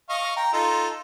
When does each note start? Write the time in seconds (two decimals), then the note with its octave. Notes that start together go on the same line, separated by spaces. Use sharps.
0.09 D#5 F5 C#6
0.36 G5 A#5
0.53 D#4 F4 A4